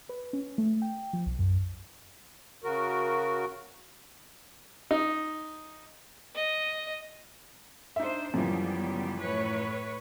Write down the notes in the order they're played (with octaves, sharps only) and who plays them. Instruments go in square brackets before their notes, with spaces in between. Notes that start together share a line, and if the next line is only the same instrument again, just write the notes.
[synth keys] B4
C#4
A3
G5
F3
B1
F#2
[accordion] C#3 F#4 A#4
[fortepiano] D#4
[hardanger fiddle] D#5
[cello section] D4 C5 [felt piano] D#4 E5
[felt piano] F#2 E3 F3 [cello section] C#3 G3 B3
[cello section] A2 B4 C#5